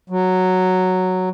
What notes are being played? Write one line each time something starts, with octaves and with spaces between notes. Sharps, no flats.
F#3